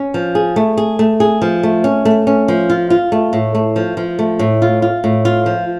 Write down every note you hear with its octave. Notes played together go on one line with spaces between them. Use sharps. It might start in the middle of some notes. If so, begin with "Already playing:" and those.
Already playing: C#4
F3
G#4
A3
G#4
A3
G#4
F3
A3
C#4
A3
C#4
F3
F4
F4
A3
A2
A3
F3
F3
A3
A2
F4
F4
A2
F4
F3